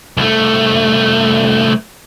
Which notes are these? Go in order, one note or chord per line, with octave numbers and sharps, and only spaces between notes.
C2 A3